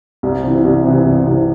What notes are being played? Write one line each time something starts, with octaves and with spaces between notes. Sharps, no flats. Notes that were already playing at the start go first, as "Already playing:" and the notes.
C2
C3 E3
C2
C3 E3
C2
C3 E3